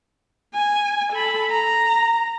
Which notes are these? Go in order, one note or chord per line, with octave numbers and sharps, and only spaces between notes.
G#5
A4 B5
A#5